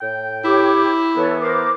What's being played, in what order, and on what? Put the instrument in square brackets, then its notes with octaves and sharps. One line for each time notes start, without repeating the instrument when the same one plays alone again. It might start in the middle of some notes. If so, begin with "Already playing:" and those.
[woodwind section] A2 G5
[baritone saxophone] E4 [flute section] G4 C#5 D6
[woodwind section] E3 B3 [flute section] A4 C#5
[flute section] A#4 C5 D6